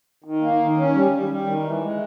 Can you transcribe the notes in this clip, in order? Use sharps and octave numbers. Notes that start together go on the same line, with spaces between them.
D#3
A#3
D#3
C#4
G3
G3
G3
D#3
E3
G#3